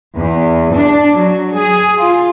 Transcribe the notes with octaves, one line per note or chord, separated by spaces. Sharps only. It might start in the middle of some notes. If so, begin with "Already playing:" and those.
E2
D4
F#3
G#4
F4